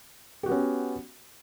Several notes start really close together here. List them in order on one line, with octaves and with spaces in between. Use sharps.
G4 F#4 B3 C#4